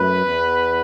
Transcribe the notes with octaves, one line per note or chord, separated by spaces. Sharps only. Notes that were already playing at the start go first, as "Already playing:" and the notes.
Already playing: F#2 A3 B4
E2 E3 B3